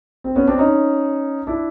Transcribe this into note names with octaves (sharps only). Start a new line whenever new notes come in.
C4
B3 C#4
C4 D4
C#4 D#4
D4 E4